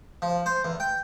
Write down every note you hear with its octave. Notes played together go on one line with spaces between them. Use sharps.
F3
C5
E2
G5